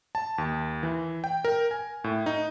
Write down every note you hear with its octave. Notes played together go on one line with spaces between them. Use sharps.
A5
D#2
E3
G5
A#4
G#5
A2
D#4